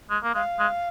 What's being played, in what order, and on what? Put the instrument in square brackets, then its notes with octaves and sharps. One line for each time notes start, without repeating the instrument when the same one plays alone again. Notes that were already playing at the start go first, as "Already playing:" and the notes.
[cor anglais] G#3
A#3
[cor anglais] G#3 [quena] F5
[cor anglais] G#3